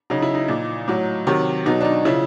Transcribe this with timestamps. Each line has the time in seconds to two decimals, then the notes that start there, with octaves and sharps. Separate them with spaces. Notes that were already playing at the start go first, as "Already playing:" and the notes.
0.10 C#3 F#3 D#4
0.22 E4
0.35 D#4
0.48 A#2 F3
0.88 A2 F#3
1.27 C3 D#3 F#3
1.66 B2 F#3 D#4
1.81 D4
1.85 D#4
2.05 C#3 F3 E4